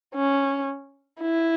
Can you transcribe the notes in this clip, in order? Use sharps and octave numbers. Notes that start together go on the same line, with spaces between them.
C#4
E4